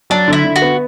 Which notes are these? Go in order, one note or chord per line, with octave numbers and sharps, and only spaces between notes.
F#3 D4
D3 E4
D3
F#4
B3